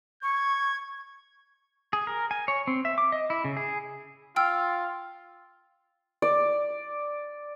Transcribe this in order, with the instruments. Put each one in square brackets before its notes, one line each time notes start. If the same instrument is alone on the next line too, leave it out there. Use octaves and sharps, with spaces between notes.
[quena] C#6 [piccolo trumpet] G#6
[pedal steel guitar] G#4
A#4
G#5
C#5
C4
E5
D6
D#5
E4
C#3
G#4
[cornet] F4 [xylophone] G5 E6 F6
[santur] D5